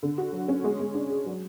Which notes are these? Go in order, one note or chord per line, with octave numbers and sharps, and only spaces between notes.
D3
F#4
F#3
C#4
G#3
G#3
D4
G#4
F#3